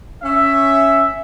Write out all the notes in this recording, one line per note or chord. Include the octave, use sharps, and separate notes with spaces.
C#4 E5